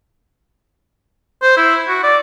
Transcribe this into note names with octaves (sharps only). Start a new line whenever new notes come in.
C5
E4
F#4
D5